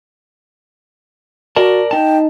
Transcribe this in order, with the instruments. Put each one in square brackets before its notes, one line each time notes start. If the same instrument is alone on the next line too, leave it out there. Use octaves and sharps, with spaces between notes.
[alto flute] F#4 [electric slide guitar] A#4 D5 A5
[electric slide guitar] D#4 A5 [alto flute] G5